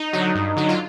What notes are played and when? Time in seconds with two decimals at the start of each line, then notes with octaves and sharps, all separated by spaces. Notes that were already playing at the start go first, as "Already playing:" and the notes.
Already playing: D#4
0.13 D3 F#3
0.35 G2
0.56 D3 F#3
0.69 F4